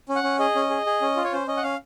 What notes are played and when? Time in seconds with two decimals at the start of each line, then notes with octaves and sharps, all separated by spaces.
0.09 C#4
0.16 F#5
0.24 C#4
0.39 G#4 D#5
0.55 C#4
0.70 G#4
0.86 G#4
1.01 C#4
1.16 F4
1.24 C#5
1.33 C#4 C5
1.47 C#4 D#5
1.57 F#5
1.63 C#4 F5